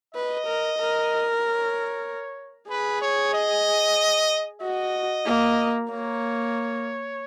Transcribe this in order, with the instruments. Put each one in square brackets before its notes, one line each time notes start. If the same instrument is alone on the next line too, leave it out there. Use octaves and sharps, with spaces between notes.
[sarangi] B4 [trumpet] D#5
[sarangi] A#4
A#4
[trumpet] C#5
[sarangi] G#4 [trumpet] B4
[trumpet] C#5
D#5
[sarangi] F#4 [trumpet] D#5
[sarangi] A#3
[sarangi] A#3 [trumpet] C#5